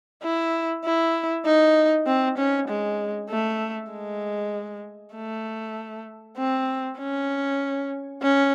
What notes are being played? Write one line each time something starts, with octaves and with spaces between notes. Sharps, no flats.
E4
E4
D#4
C4
C#4
G#3
A3
G#3
A3
C4
C#4
C#4